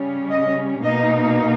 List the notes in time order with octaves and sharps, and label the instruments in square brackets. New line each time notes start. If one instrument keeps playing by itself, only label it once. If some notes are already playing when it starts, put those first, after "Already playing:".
Already playing: [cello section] C#3 G3 C#4
D#5
B2 A#3 D#4 D#5